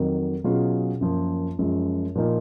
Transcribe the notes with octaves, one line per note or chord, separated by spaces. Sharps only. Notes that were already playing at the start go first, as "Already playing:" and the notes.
Already playing: F2 D#3 F#3
B2 F#3 C#4 F4 G#4
F#2 F3 A#3 F4
F#2 F3 G#3
A#2 F3 A#3 D#4